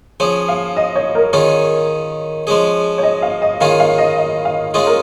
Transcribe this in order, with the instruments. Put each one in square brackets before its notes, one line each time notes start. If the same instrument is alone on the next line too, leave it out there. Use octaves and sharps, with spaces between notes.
[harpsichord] F3 C#4 G#4 [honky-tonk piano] C#5
[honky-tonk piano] F5
D#5
C#5
A#4
[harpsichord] D#3 C#4 F4 G#4 [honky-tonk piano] C#5
[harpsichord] F3 G#3 C#4 G#4
[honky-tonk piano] C#5
D#5
F5
D#5
[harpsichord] D#3 C#4 F4 G#4 [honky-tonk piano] F5
[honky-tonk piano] F5
D#5
D#5
F5
[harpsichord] G#3 C#4 F4 G#4 [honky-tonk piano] D#5
[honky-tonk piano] A#4